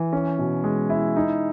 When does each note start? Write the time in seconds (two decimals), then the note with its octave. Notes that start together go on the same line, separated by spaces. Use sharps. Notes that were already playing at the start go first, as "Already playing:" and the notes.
Already playing: E3
0.13 C#4
0.38 B2
0.64 G#3
0.90 E4
1.16 D#4